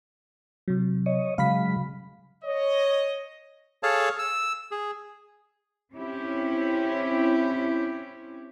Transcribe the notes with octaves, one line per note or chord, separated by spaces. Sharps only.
C3 F#3
C#5 D#5
C#3 F#3 G#3 F5 B5 B6
C#5 D#5
G#4 A4 C#5 F5 A5
E6
G#4
C4 C#4 E4 G4